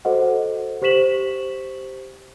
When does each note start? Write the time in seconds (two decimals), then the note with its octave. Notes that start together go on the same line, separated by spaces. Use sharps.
0.05 F#4 A4 C5 D#5 F#5
0.82 G4 C5 C#6 B6 E7 F#7